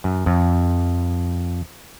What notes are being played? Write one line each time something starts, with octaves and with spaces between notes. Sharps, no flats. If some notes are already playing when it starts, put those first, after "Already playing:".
F#2
F2